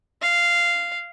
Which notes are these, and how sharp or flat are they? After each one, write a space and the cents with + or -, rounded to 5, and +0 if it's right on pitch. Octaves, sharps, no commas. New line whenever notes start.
F5 -10